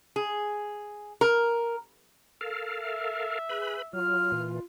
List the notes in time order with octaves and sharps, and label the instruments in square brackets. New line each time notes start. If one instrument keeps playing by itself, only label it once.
[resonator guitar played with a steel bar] G#4
A#4
[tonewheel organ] A4 A#4 F5
[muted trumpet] E5
[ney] G#4 [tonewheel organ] B4 B5
[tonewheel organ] F#3 [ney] F4 [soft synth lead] F6
[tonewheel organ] A#2 E3